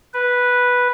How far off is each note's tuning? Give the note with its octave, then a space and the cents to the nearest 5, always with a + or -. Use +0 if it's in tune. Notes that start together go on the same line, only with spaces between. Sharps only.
B4 -5